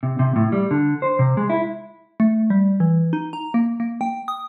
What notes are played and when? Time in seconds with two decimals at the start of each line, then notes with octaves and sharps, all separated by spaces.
0.03 C3
0.19 C3
0.36 A2
0.52 G3
0.71 D3
1.02 C5
1.19 C3
1.37 G#3
1.50 E4
2.20 A3
2.50 G3
2.80 E3
3.13 D#4
3.33 A#5
3.54 A#3
3.80 A#3
4.01 G5
4.28 D#6